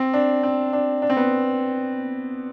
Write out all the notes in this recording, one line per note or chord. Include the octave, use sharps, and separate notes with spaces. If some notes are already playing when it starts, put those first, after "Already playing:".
Already playing: C4
D4
C4
D4
D4
C4
B3